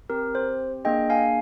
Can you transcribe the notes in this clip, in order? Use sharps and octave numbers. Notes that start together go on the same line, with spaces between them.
C4 G4 A#4
C5
A#3 D4 G#4 D#5 G5
F5 G#5